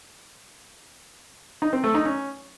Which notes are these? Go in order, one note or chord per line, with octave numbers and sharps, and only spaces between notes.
D#4
C4
A3
D#4
C#4